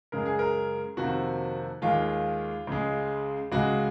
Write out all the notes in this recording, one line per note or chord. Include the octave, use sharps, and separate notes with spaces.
F#2 C#3 G#3 A#4
G#4
A#4
F2 C3 D#3 A#3 F#4
D#2 D#3 G#3 F4
C#2 C#3 G#3
C#2 C#3 G#3 F#4